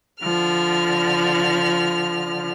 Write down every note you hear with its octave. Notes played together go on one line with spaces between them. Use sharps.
D3 F3 F6